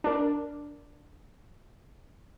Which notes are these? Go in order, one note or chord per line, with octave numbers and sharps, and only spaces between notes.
D4 A#4